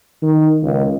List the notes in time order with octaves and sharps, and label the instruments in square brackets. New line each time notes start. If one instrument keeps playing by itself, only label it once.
[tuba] D#3
C#2